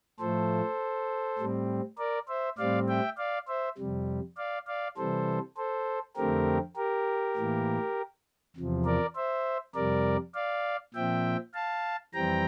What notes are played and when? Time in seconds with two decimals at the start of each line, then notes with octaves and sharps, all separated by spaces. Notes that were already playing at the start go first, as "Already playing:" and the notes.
0.19 A2 F3 A3 A4 C5
1.38 A2 G3 C4
1.98 A#4 D5
2.28 C5 E5
2.58 A2 G3 C4 D5 F5
2.88 E5 G5
3.18 D5 F5
3.48 C5 E5
3.78 F2 C3 G3
4.37 D5 F5
4.67 D5 F5
4.97 C3 E3 G3 A4 C5
5.57 A4 C5
6.17 F2 D3 A3 C4 G4 A#4
6.76 G4 A#4
7.36 A2 E3 A#3
8.56 E2 C3 F3
8.85 A#4 D5
9.15 C5 E5
9.75 F2 C3 G3 A#4 D5
10.35 D5 F5
10.94 A#2 F3 C4 E5 G5
11.54 F5 A5
12.14 F2 E3 G3 C4 G5 A#5